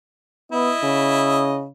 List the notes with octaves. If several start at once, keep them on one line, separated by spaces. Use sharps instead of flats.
B3 E4 D#5
C#3